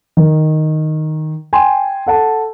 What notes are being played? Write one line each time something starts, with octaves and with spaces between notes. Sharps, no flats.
D#3
G5 G#5 C6
A4 F#5 A5